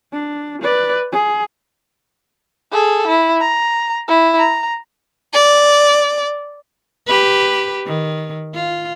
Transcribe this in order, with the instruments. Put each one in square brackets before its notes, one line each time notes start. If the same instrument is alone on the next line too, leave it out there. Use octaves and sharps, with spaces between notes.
[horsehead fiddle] D4
B4 D5
G#4
[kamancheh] G#4 A4
E4
A#5
E4
A#5
[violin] D5
[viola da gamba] G4 B4
D#3
F4